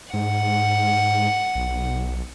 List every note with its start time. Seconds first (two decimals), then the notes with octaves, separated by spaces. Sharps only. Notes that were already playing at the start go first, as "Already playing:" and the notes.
0.13 G#2 F#5
1.55 B1